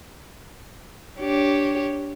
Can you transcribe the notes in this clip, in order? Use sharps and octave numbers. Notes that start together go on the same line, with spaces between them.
D4 G4 C#5